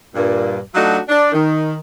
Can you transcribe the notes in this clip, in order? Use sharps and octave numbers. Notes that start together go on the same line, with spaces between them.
G2 A#2
F#3 A3 D4 D#4 F4 F#4
D4
D#3